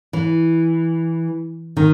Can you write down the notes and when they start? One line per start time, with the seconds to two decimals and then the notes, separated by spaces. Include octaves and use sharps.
0.13 E3
1.77 D#3